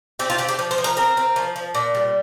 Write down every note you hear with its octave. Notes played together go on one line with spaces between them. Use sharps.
C4 G4
F4
C4 G4
G4
F3
C5
F3
A#4
C4 A#4
C4
F3
F3
A#2
G3